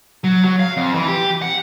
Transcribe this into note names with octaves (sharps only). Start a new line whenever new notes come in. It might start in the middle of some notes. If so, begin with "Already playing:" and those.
F#3
F#3
F5
F2
E3
G4
F#5